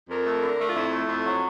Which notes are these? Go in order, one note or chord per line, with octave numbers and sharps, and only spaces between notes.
F2 A#4
A3
D3
A3
F4
F2 E4
A3
F2
F#3